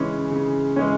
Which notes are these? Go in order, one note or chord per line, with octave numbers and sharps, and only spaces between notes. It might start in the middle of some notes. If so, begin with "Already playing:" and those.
Already playing: C#3 E3 G#3 C#4
C#3
E3 G#3 C#4